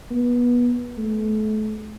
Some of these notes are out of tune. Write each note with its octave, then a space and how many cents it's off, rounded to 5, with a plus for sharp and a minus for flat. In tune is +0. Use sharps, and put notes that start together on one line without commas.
B3 -25
A3 -35